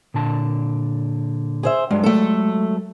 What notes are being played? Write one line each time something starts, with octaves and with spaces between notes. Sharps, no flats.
A#2 D3 A5
G#4 C5 E5
G2 F#3 G#3
A3 A4